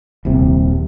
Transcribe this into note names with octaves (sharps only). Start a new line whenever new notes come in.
D#1 C2 C3